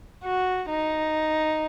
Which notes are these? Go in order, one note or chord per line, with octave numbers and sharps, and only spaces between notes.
F#4
D#4